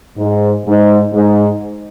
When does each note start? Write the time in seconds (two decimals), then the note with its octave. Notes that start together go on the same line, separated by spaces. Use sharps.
0.18 G#2
0.66 G#2
1.14 G#2